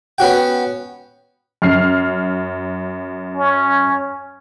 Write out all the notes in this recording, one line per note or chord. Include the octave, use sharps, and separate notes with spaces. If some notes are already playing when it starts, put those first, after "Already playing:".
B3 C#4 F#4 G5
F#2 F6 C7
C#4